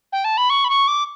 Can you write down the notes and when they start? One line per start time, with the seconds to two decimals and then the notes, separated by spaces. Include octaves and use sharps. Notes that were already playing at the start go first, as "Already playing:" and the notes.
0.12 G5
0.24 A5
0.37 B5
0.50 C#6
0.64 B5
0.69 C#6
0.88 D6